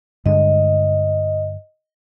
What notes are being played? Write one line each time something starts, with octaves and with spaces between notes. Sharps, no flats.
G2 D3 G#3 D#5